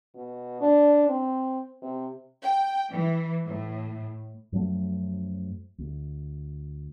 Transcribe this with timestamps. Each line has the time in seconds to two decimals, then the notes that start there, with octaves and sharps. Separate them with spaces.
0.15 B2
0.60 D4
1.09 C4
1.82 C3
2.43 G5
2.90 E3
3.46 A2
4.52 F#2 F3 F#3 A3
5.78 D2